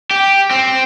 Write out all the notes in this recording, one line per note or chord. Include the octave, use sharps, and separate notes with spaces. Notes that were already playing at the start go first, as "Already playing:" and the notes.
G4
C4